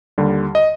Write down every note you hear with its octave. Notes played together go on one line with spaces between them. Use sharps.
D#2 D3 G3
D#5